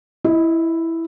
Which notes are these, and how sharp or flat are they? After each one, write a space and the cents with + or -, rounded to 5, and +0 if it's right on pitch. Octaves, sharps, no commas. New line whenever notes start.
E4 +0 D#5 +25